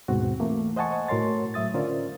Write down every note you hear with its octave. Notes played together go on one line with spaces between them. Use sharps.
D#2 G#2 B2 C4 F#4
E3 A3 A#3
C5 D#5 F#5 G#5 A5 C#6
A2 F#4 A#4 C#5 C6 A6
A2 F#3 E5 D#6 A6
D3 C#4 F4 A#4 C5 D5